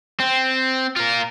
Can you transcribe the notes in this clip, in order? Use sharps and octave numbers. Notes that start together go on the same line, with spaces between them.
C4
F4 A#4